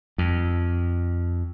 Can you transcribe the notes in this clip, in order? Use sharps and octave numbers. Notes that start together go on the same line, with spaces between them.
F2